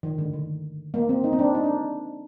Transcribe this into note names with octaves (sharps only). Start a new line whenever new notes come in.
D#3
D3
D#3
A#3
C4
D#4
C4
D4
D#4
D4